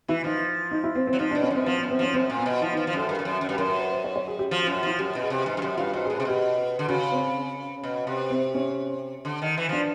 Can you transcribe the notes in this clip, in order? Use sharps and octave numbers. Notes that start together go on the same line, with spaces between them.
E3 E4
F3 D#4
D#4
E4
C4
C4
F#3
F3 D#4
D4
B2
C#4
F#2 C4
F3 C4
B3
F#2
C4
F3 C#4
F#2 C4
A#2
B3
B2
F3 E4
D#4
F3
F3
F#2 A4
G2 A#4
G2
F#2
F#2
G2
F#2 A#4
A#4
B4
C5
C#5
C#5
G#4
G4
F3 F#4
F4
F#2
F#4
F3 E4
F#2 G4
B2
G#4
C3
G#2
G2
F#2 G4
G2 F4
G#2 F#4
G#4
A2
G#4
C3
B2 G4
D3
C#3 F#4
C4
B2
C3
C4
C#4
D3
D#3
E3
F3 D4